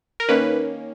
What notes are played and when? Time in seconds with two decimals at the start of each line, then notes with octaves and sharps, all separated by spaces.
0.20 A#4
0.29 D#3 A#3 C#4 B4